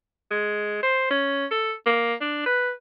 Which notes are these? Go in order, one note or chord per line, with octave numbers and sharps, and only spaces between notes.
G#3
C5
C#4
A4
A#3
D4
B4